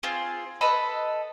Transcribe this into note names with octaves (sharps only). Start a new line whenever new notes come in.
C4 F4 G#4
A4 B4 D#5 B5